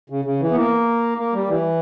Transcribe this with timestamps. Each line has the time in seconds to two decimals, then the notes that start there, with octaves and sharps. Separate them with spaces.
0.10 C#3
0.25 C#3
0.40 E3
0.51 B3
0.56 A#3
1.18 A#3
1.33 G3
1.48 E3